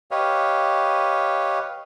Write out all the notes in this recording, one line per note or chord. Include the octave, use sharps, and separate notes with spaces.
G4 B4 C#5 D#5 F5